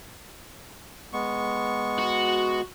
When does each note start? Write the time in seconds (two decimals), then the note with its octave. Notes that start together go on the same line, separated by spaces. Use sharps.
1.13 G#3 B3 C#6
1.99 F#4